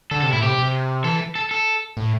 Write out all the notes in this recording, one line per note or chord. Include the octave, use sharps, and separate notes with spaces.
D3 A4
C3 A4
A2 E4
C3 G4
C3
E3 A4
A4
A4
A2